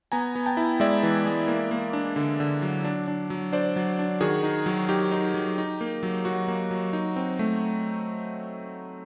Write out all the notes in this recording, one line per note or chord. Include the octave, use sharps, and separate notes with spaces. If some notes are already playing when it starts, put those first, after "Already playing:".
B3 G#5 A#5
B3
G5 A5
E4
G#3 D5 E5
E3
G#3
A#3
A#3
D4
D3
D3
F#3
D4
D4
F#3
D4 C5 D5
F#3
D4
D#3 F#4 G#4
D#4
F#3
D#4 G4
D#4
F#3
D#4
A#3
F#3
F#3 F#4
A#3
F#3
D#4
C4
A3